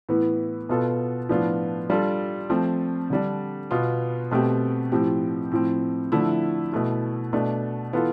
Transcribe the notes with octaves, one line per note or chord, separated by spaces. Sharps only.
A2 E3 B3
B2 B3 F4 A4
A2 F3 B3 D4 F4
G3 D4 F4 A4
F3 A3 C4
D3 G3 D4
B2 B3 F4
B2 A3 C4 G4
A2 F3 C4 G4
A2 F3 C4
D3 F3 A3 E4
B2 A3 E4
B2 A3 D4
E3 B3 F4 A4